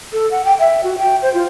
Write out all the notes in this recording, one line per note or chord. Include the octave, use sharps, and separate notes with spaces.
A4
F#5
G5
E5
F#4
G5
C5
F4